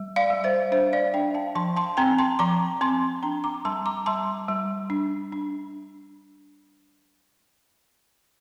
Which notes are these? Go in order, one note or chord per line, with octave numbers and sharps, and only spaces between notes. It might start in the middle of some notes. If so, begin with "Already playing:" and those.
Already playing: G3
D5 F5
G3
C5 E5
D4 C5 E5
D5 F5
D4 E5 G5
F5 A5
F3 A5 C6
A5 C6
C4 G5 A#5
A5 C6
F3 A#5 D6
C4 A5 C6
D4 G5 A#5
A#5 D6
G3 A5 C6
A#5 D6
G3 A5 C6
G3
D4
D4